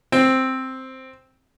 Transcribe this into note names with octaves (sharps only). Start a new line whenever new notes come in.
C4